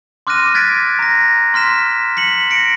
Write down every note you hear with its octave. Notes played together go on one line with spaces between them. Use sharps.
C6 D6 F6 F#6 A#6 D#7
F#6 G#6 A6 B6 D7
A#5 A#6
C6 F6 B6 E7
B6 C#7 F#7
A#6 C#7 D7